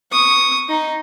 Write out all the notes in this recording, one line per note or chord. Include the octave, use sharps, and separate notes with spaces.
C#6 D#6
D#4